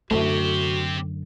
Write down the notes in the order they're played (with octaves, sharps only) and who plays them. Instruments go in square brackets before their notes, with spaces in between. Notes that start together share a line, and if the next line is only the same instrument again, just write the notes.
[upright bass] F#2 D3 [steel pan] A3 [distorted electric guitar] C4 G4 [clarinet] F#4